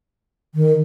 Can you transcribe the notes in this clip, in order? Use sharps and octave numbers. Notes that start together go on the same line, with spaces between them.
D#3